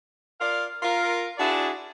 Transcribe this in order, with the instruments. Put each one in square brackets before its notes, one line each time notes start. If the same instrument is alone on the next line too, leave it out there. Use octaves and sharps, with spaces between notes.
[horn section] F4 A#4 D5 F5
F4 A#4
D4 E4 F#4 G#4 D5